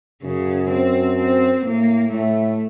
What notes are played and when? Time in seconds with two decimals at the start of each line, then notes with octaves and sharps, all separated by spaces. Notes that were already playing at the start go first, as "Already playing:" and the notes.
0.23 F#2 C#3
0.71 C4
1.18 C4
1.65 A2 A#3
2.12 A2 A3